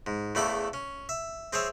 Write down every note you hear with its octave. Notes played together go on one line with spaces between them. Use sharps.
G#2
E2 C#3 A3 E4 B5 D6
C#4
E5
C4 G#4 C5 C#5 E5